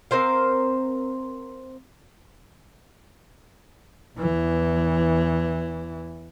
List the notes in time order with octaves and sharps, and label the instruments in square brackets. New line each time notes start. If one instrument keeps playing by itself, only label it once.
[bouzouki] C4 A#4 C5 F5
[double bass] E2 E3